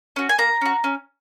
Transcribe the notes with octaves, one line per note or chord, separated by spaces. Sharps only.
C#4 F#4
G#5
A#3 A#5
C#4 F#4
C#4